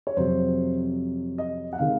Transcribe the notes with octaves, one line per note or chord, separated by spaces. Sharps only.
C#5
F2 C3 F#3 C5
D#5
F#5
C3 D#3 G#3 F5